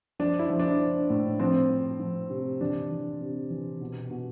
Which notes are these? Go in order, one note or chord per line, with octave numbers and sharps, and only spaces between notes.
F3 D4
E4
F3
D4
F3
A2
F3 C4
F3
F3
C3
E3 D4
E3
C3
E3
B2
B2